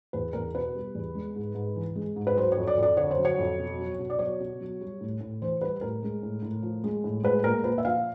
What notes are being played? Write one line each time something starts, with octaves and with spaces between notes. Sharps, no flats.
E2 B4
E2 A#4
B2 B4
G3
E2
G#3
G#2
G#2
E3
G#3
G#2
B4
F#3 C5
F2 C#5
D5
F2 D5
D3 C#5
C5
F#3
C#5
F2
B2
F#3
B2
D5
F#3 C#5
B2
F#3
G3
A2
A2
E3 C5
G3 B4
A2 A#4
G#3
A2
A2
F3
G#3
A2
G#3 B4
A#2 A#4
A#2 B4
E5
F3 F5